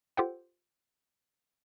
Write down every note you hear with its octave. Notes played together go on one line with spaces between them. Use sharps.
F4 G4 A4 C5 F#5 G5